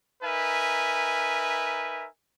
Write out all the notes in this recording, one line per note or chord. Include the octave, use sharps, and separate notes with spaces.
D#4 A#4 B4 E5 G#5